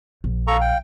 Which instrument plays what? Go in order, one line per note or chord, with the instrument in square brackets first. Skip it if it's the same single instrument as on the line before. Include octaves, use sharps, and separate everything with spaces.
[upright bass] A#1
[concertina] A4 A#5 C#6 [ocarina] F5
[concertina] G5